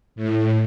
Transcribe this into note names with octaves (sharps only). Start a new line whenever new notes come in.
A2